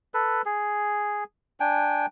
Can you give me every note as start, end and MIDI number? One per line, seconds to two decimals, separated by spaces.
0.14 0.42 69
0.14 0.42 71
0.45 1.24 68
1.60 2.06 62
1.60 2.06 79
1.60 2.06 80